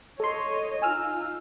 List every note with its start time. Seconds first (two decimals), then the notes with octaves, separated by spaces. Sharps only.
0.20 A4 C#5 D#5 C6
0.82 D#4 F4 G#5 E6 F6